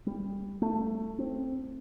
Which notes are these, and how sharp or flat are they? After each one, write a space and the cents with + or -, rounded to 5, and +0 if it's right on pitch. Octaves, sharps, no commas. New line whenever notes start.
G3 +20
A3 +15
C4 +5